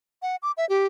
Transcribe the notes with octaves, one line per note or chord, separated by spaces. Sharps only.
F#5
D6
E5
G4